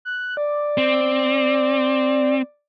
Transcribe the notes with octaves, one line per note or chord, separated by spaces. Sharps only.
F#6
D5
C4